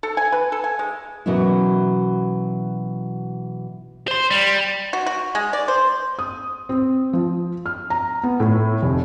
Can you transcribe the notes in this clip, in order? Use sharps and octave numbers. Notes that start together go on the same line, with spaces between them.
A4
G#5
B4
A4
G#5
G#3
B2 E3 F#3 A#3 C#4 E4
C5 C6
G3
F#4
F#4
G#3
D5
C5
D#6
C4
F3
F6
A#5
B3
A2
F1